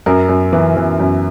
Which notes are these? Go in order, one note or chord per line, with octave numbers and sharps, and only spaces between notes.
F#2 A#4
F#2
E3
E3
F#2